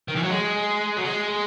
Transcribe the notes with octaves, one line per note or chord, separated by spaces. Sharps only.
D#3
E3
F#3
G#3
F#3
G#3